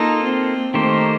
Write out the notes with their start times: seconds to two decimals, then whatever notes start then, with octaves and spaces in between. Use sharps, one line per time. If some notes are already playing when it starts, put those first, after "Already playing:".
Already playing: A#3 D#4 F4 A4
0.23 C4
0.74 D#3 A3 A#3 D#4 G4 C5